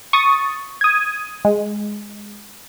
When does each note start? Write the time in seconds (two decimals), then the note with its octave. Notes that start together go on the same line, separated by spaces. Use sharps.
0.13 C#6 D#6 A6
0.81 D#6 G#6
1.45 G#3